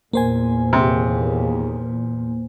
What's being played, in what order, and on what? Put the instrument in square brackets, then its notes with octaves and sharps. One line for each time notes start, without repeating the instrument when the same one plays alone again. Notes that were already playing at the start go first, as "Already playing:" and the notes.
[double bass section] E2 A#2 [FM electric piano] A#3 C5 G#5
[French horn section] D#2 G#4 [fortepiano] C3